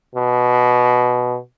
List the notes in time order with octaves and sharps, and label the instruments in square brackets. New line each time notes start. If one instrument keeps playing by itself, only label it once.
[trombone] B2